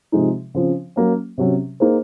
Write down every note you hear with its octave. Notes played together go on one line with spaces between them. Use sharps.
C3 F3 G#3 D#4
C#3 F3 C4
F#3 A#3 C#4
C3 F#3 C#4
A#3 D#4 G#4 C5